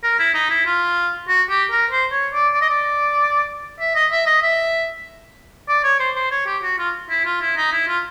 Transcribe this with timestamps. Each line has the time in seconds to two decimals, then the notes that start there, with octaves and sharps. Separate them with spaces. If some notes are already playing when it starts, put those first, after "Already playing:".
0.04 A#4
0.19 E4
0.34 D#4
0.50 E4
0.66 F4
1.28 F#4
1.50 G4
1.71 A#4
1.91 C5
2.12 C#5
2.34 D5
2.54 D5
2.62 D#5
2.70 D5
3.80 E5
3.95 D#5
4.12 E5
4.26 D#5
4.42 E5
5.68 D5
5.84 C#5
6.00 C5
6.16 C5
6.31 C#5
6.46 G4
6.63 F#4
6.79 F4
7.10 E4
7.25 F4
7.41 E4
7.57 D#4
7.72 E4
7.88 F4